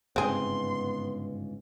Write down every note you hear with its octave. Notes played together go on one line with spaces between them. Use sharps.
G1 G#2 C#3 B3 C4 G#4 C6